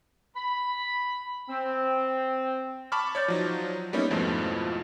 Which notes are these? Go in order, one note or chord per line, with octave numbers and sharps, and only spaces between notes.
B5
C4
A5 B5 C#6 D6 F6
C#5 D5 G6 A6
F3 F#3 D#4
G3 A#3 B3 C#4 D#4 E4
F2 G#2 B2 F3 A3 E4